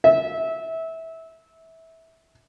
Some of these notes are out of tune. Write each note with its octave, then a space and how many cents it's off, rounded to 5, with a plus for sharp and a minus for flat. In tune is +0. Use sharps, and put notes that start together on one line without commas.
E5 -20